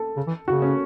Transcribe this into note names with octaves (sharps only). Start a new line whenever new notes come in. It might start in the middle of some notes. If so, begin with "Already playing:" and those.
Already playing: A4
C#3
E3
C#3 F#4
C#4